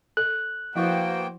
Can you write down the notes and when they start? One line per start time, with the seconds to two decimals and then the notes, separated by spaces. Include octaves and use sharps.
0.17 A4 F#6
0.76 F3 A#3 B3 E4 F#4 C5 G5 C#6